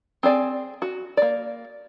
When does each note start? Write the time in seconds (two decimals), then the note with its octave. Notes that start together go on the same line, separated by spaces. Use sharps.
0.23 C4 G#4 D5 G#5
0.82 F#4
1.17 A#3 D5